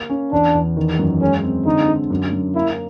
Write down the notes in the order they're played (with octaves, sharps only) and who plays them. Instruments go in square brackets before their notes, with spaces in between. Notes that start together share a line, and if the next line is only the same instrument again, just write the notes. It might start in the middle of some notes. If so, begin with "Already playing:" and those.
Already playing: [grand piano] A#3
C#4
[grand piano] E2 [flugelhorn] D4
[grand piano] E2
D#3
F#2
[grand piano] G#3 [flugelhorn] C#4
[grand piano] C4
[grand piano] D3 [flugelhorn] D#4
[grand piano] D3
F#2
F#2
[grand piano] A#3 [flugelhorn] E4